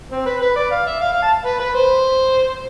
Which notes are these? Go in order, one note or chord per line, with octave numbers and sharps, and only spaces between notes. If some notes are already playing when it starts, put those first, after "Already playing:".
C4
B4
B4
D5
F5
E5
F5
F5
A5
B4
B4
C5